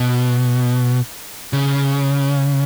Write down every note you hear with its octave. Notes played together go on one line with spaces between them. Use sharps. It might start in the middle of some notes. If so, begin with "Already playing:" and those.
Already playing: B2
C#3